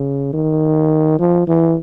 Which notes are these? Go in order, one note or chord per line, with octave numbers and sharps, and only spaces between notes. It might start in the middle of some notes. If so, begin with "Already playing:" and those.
Already playing: C#3
D#3
F3
E3